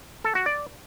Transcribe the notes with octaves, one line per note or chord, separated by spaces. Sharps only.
A4
F#4
D5